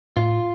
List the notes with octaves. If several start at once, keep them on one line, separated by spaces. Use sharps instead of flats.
A2 F4